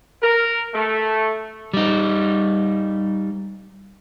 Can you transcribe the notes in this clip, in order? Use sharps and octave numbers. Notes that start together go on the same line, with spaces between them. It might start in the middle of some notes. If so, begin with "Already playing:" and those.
A#4
A3
G3 D#4